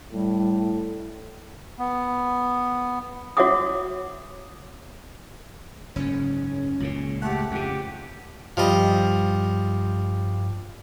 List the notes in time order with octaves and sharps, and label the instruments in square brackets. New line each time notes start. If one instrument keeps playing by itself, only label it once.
[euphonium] A2 [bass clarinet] G3
[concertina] B3
[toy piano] F#4 C#5 E5 F#5 D6 D#6
[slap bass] F#1 G#2 [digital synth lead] C#4
[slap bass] C#2 A#2 C#3
[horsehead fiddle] A3 G4 [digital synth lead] F#5
[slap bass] F2 C#3 [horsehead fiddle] G4
[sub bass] G2 [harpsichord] F3 G3 D#5